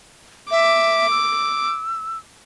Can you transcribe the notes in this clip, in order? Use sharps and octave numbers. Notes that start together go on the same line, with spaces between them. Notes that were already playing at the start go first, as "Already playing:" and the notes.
E5 D6
E6